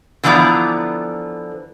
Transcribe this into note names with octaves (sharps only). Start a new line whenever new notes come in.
D3 E3 F3 B3 D5 A#5